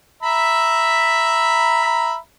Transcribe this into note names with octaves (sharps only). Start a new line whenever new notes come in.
E5 A#5 B5